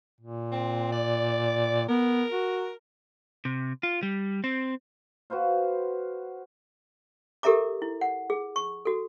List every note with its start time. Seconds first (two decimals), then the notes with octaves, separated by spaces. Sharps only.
0.21 A#2
0.52 C4
0.93 D5
1.89 B3 A#4
2.32 F#4
3.45 C3
3.83 F4
4.03 G3
4.44 C4
5.30 F#4 B4 C5 F5
7.43 G4 A4 A#4 E5 A#5 D6
7.82 E4
8.01 F#5
8.30 G#4
8.56 C#6
8.85 F#4 A4